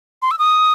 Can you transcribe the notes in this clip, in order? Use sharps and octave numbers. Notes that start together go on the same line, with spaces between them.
C6
E6
D#6